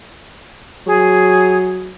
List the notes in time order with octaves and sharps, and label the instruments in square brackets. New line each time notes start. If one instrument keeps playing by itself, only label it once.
[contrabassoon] F#3 [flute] G#4